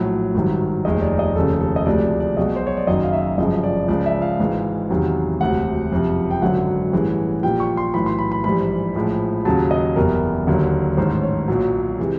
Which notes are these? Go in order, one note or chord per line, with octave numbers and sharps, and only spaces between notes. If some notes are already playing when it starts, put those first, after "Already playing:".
Already playing: A#1 A2 F#3
G#1 G2 D#3 F#3
F1 D#2 D#3 G#3 D#5
D5
D#5
F1 D#2 C#3 A4
A4
D#5
D2 C3 F3 G#3 D5
D5
D5
B1 B2 G#3 D#5
C5
C#5
D5
F#1 F#2 D#3 F#3 D#5
F5
E5
G1 F#2 C#3 F3 G#3 D#5
D5
C#2 C#3 F3 G#3 D5
E5
F5
G#1 G#2 E3 G#3
E2 C3 D#3 F#3
E1 D2 C3 F#5
F#1 F2 C3 F3
G5
G#1 F#2 D3 F#3 F#5
A1 G2 E3 G#3
A#1 A#2 G3 G5
C#6
C6
B1 A2 E3 B5
C6
B5
B5
A#1 G#2 E3 G3 B5
A#1 A2 F3 G#3
D#2 C#3 F#3 A5
D#5
F#1 E2 B2 G3 A#4
D#2 D3 F#3
A1 G#2 D#3 C5
C#5
B1 A#2 F#3
C3 E3 G#3